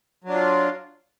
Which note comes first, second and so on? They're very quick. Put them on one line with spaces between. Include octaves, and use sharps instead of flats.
F#3 D4 F4